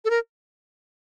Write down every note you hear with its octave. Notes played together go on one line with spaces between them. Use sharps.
A4
A#4